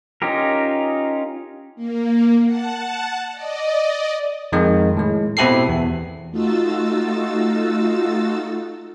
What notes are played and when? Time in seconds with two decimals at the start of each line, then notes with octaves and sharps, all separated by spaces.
0.22 C#4 D#4 F4 G4 A#4
1.76 A#3
2.43 F#5 A5
3.31 D5 D#5
4.52 F2 D#3 G#3
4.97 A2 G#3
5.37 B2 C4 E4 G4 A4 C7
5.69 E2
6.31 A3 D#4 F4 F#4 E6 A6